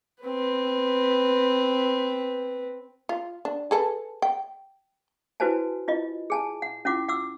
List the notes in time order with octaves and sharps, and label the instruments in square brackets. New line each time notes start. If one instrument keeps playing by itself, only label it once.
[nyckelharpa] C4 B4
[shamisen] F4
D4
G#4 A4 B4
G5
[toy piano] E4 F#4 B4 C5 G#5 A5
E4 F4 D#5
G#4 G#5 A5
F#5
C#4 E4 F4 F#5 D6
F#5 D6 E6